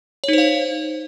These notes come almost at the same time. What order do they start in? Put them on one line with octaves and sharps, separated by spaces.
C#5 D#4 C5 F5